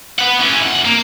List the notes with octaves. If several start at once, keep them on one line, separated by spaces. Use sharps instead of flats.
B4 F#5
E3 C#4
F2 F#5
A#3